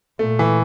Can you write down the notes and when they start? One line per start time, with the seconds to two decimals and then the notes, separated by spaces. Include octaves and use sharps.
0.19 A#2 A3
0.39 E3